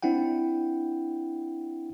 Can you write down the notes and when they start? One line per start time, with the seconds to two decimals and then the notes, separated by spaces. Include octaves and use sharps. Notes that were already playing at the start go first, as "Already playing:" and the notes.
0.03 C4 D4 E4 F#5 G5